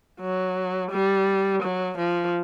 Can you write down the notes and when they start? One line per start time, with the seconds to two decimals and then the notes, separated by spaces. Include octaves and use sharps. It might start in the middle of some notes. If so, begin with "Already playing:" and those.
0.20 F#3
0.91 G3
1.62 F#3
1.97 F3